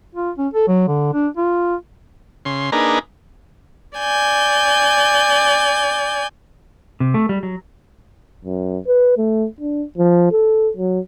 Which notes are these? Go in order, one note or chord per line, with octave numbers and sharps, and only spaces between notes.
F4
C#4
A4
F#3
D3
D4
F4
C#3 C6
A#3 D4 D#4 G#4 B4 A#5
D5 G#5 G6
C3
A3
G3
F#3
F#2
B4
A3
D4
F3
A4
F#3